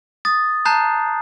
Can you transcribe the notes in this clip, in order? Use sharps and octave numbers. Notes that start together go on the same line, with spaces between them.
D#6 A6
A5 A#5 F#6 G6 C7